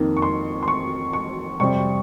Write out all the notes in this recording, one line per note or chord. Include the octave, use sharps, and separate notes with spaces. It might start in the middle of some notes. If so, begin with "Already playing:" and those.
Already playing: F2 D#3 A#3
C#6
C6
C6
C#6
C#6
F2 C3 G3 C4 C#6